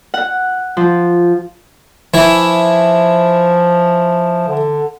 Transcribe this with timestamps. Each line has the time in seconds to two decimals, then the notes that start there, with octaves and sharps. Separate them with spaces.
0.14 F#5
0.77 F3
2.14 E3 F3 E4
4.48 D3